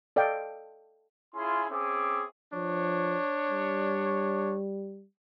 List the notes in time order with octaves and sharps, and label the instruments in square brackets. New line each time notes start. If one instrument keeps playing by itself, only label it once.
[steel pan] A4 D5 D#5 F5 G5
[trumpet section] C#4 E4 F4 G#4 C6
C4 C#4 G#4 E5 D6
[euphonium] F3 [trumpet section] D4 C#5
[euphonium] G3